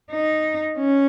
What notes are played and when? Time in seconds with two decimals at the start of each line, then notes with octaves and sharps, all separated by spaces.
0.11 D#4
0.78 C#4